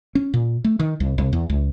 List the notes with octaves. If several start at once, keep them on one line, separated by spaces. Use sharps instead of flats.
C#4
A#2
A3
D#3
C2
C2
E2
C#2